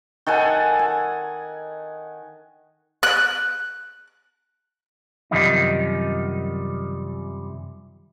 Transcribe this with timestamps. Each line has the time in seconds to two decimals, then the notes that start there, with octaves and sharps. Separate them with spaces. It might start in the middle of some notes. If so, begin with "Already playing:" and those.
0.26 D#3 A4 F#5 G#5
0.79 G#5
3.03 F#6
5.31 F#2 C3 D#3 F3 G3 D#4